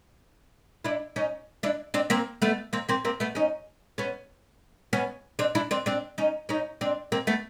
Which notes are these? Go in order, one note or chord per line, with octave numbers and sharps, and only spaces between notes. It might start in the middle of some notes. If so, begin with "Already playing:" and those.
D4 E4
C#4 D#4
D4 E4
C4 D4
A#3 C4
A3 B3
A#3 C4
A#3 C4
A#3 C4
A3 B3
C#4 D#4
B3 C#4
B3 C#4
C4 D4
D4 E4
C4 D4
C4 D4
C#4 D#4
C#4 D#4
C4 D4
A#3 C4
A3 B3